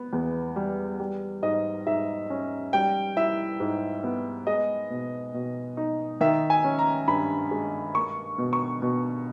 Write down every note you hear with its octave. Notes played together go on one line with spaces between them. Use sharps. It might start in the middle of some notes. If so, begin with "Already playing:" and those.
Already playing: B3
E2
G3
G3
G#2 D#5
G#2 E5
C#4
G3 G5
E4 E5
G#2
B3
G#3 D#5
B2
B2
D#4
D#3 E5
G#5
C#4
A#5
G2 B5
G#3
A#3 C#6
B2
C#6
B2